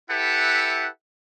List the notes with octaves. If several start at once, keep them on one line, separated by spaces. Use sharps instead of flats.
E4 G4 A4 B4 E5 F#5